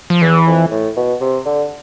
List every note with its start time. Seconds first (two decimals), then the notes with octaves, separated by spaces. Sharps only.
0.10 F3
0.21 E2 E3
0.47 F2
0.71 A2
0.96 B2
1.21 C3
1.45 D3